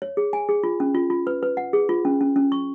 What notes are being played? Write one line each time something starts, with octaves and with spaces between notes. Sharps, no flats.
C#5
G#4
G#5
G#4
F4
C#4
F4
F4
B4
B4
F#5
G#4
F4
C#4
C#4
C#4
C#6